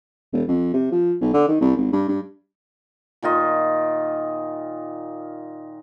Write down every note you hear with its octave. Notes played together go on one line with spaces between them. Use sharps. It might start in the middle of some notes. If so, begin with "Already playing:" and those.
E1
F2
C3
F3
B1
D3
D#3
C2
G#1
G2
G2
A#2 D#3 F4 D#5